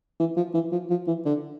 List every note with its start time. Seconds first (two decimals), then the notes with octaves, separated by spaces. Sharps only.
0.20 E3
0.36 F3
0.54 E3
0.72 F3
0.90 F3
1.07 E3
1.25 D3